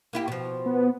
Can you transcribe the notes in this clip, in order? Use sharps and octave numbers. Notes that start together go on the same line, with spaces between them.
A#3 E4 G4
B2 F3
B3